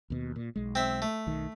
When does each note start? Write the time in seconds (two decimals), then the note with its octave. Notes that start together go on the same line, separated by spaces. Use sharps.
0.10 D#2 B2
0.36 A#2
0.56 B1 G#3
0.75 C4 E5
1.02 A3
1.27 B1 D#3